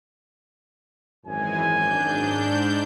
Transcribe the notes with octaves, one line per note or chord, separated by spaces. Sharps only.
G#1 F#2 E3 G#3 G#5
G#2 D4 G6